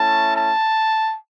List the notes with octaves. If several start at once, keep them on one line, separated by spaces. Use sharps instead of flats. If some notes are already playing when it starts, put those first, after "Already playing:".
Already playing: A3 C#4 E4 A5
A5